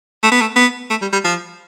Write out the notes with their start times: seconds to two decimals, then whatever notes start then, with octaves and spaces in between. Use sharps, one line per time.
0.23 A3
0.32 B3
0.41 A3
0.56 B3
0.90 A3
1.02 G3
1.13 G3
1.24 F3